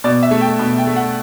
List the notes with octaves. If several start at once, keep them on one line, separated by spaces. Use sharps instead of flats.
B2 D5
E5
A3
G5
B2
G5
A3
F#5